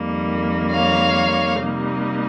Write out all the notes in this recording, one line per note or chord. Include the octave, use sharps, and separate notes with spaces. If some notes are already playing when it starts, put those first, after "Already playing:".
Already playing: F2 D#3 G3 A#3
C#5 F5
C3 G3 A#3 D#4